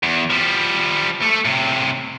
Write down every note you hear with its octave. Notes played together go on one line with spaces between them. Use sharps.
E2
F3 G3
A3 A4
A2 C3